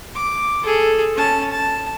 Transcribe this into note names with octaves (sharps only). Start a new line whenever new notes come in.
D6
G#4 A4
C#4 A5
A5